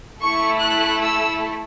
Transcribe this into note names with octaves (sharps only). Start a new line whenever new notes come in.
A3 E4 A4 C#6
F#6
E6